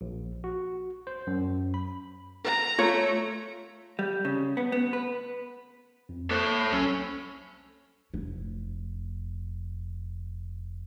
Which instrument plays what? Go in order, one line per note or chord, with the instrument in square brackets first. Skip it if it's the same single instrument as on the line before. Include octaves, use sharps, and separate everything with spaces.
[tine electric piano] A#1
F#4
C5
F#2
B5
[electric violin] A#5
[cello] A3 [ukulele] F4 C#5
[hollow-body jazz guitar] G3
C#3
B3
B3
B4
[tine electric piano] F2
[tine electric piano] A#3 C5 F#6 [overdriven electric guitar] A4 C#5
[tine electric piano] C2 F#3 E6 [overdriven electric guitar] C#4
[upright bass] F1 E4